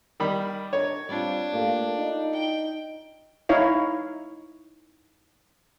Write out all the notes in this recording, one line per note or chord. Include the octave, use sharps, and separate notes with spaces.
D#3 G3 B5
D4 D#4 A#4 C#5
G3 C4 D4 F4
A3 A#3 F4 G4
D#4
G5
D#4 E4 C#5 F5